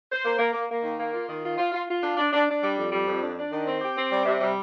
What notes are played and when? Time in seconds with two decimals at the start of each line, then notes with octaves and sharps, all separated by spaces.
0.10 C5
0.24 A#3
0.39 A#3
0.53 A#3
0.69 A#3
0.83 D#3
0.99 A#3
1.14 F4
1.28 D#3
1.43 F4
1.58 F4
1.72 F4
1.88 F4
2.03 D4
2.17 D4
2.32 D4
2.48 D4
2.63 G3
2.77 F2
2.92 G3
3.07 F2
3.21 D4
3.37 D4
3.51 D#3
3.66 C4
3.81 G4
3.96 C4
4.11 G3
4.25 C3
4.41 G3